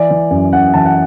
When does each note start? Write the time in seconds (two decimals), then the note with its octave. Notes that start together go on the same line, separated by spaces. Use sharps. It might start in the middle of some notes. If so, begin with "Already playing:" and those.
Already playing: E3 D5
0.10 E3
0.30 F#2
0.52 F#2 F#5
0.74 E3 A5
0.86 F#5